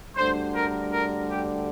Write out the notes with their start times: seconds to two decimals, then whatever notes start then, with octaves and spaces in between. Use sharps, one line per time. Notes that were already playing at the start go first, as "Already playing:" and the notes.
0.16 D2 D3 G3 C5
0.54 A#4
0.92 A#4
1.30 G4